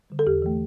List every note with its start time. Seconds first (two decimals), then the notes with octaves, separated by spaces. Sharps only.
0.10 D3 G3
0.19 A4
0.27 E2 G4
0.42 E3 A3